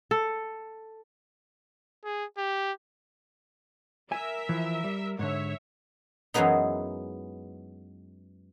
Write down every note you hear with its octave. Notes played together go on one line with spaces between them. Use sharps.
A4
G#4
G4
A#4 E5 G#5
E3 F3
G3
G#2 D3 C#5 E5
F#2 E3 F#3 G#3 B3 D#4